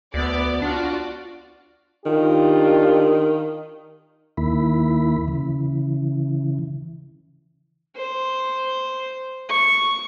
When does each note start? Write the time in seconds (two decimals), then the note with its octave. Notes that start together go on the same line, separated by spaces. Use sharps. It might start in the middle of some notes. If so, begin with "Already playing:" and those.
0.14 D2 B3 D5
0.62 D4 F4 F#4 D5
2.06 D#3 D4 F4 G4
4.37 D#2 D#3 A#3 E4 B5
5.28 C#3 E3
7.96 C5
9.49 C#6